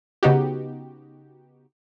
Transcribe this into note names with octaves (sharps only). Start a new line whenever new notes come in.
C#3 B3 D#4 F#4 G4